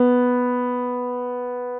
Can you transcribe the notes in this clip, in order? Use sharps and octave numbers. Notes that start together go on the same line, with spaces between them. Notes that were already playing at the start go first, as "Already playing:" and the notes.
Already playing: B3